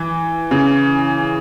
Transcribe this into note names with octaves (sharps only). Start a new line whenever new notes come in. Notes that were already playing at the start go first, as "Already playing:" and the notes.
Already playing: E3
C#3